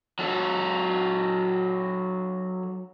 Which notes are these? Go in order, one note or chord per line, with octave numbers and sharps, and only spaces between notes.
F#3 A4